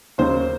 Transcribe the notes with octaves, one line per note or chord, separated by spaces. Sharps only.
D#2 C#3 F#3 C5